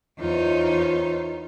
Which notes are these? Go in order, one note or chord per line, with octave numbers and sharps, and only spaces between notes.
E2 D#4 F4 C5 C#5